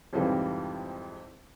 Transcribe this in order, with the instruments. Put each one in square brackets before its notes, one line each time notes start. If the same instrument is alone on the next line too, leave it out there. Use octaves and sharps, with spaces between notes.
[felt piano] F2 G#2 C3 E3 F3 G3